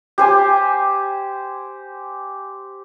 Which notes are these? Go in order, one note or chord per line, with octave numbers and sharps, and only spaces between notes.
G4 C5 G#5